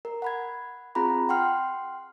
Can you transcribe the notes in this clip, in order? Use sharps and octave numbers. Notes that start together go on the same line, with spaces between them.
A#4
F#5 B5 G#6
C4 F4 G#4 A#5 B5
F#5 G5 C6 F6